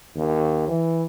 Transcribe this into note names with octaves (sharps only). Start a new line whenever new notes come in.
D#2
E3